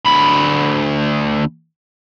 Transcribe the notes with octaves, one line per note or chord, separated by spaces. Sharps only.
D2 B5